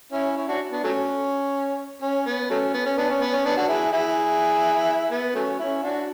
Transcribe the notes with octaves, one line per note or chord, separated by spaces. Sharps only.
C#4 E4
C#4 E4
D4 F#4
B3 D4
F#3 A3 C#4
C#4
B3
F#3 A3 C#4
B3
C#4
B3 D4
C#4
B3
C#4
B3 D4
D4 F#4
E4 G#4
E4 G#4
B3
F#3 A3 C#4
C#4 E4
D4 F#4